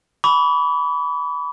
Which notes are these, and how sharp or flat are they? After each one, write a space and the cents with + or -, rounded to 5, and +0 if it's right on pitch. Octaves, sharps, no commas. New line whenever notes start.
B5 +0 D6 -45